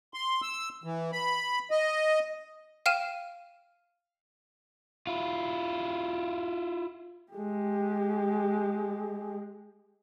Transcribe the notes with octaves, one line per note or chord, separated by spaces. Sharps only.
C6
E6
E3
B5
D#5
F5 G5 F6 D#7 E7
E4 F4
G#3 G4